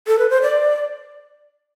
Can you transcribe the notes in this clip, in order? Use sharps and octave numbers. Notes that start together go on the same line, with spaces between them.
A4
B4
C5
D5